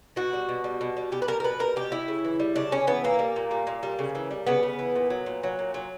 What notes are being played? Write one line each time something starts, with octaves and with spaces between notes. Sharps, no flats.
B2 F#4
G3
B2
G3
B2
G3
B2 G4
B4
G3 A#4
A#4
B2 B4
G3 A#4
B2 G4
G3 E4
C#3
E3
G3
C#3 D4
C#3 C#4
E3 B3
A#2 A#3
G3
A#2
G3
A#2
G3
C#3
E3
G3
C#3 B3
C#3
E3
A#2
F#3
A#2
F#3
A#2
F#3